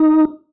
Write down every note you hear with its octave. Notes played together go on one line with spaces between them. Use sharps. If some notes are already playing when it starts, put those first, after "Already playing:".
Already playing: D#4